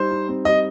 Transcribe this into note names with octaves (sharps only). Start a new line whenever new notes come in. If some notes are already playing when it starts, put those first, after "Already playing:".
Already playing: G3 D#4 C5
D#4
C4
G3 D#5